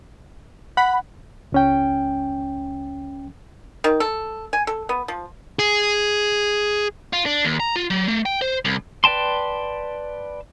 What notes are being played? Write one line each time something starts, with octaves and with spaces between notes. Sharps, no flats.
F#5 B5
C#2 C#4 G5
D#3
A4
G#5
A4
B3
F3
G#4
F4
D4
D#2
A#5
F4
F#3
A3
G5
C5
C2
B4 D5 G5 A5 C6